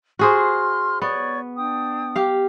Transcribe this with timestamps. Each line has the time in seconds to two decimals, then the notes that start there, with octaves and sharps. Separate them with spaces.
0.19 F#4 G#4 C5 C6 F6
1.02 B3 C#5 D5 C#6
1.57 D4 G5 D#6
2.16 G4 F5